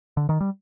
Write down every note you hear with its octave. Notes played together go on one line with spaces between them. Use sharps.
D3
D#3
G3